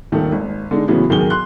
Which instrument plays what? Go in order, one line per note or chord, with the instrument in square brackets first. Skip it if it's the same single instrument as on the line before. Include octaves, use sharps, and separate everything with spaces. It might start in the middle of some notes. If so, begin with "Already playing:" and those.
[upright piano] D#1 D#3 A3
G#1
D3 G#3 D#4
A2 C#3 E3 F#3 B3
B1 D#3 G#4 G7
C6 F#6